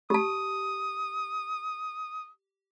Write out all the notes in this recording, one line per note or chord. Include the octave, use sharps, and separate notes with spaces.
G4 A5 D#6